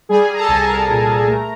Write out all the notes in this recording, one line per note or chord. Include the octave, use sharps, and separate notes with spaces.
G3 G#4 G#5
G3 A#5
A4 A5
C2 G#5
A5
C2 A#4 A#5
A#2
A#2
A3